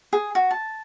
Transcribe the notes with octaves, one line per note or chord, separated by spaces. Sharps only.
G#4
F#4
A5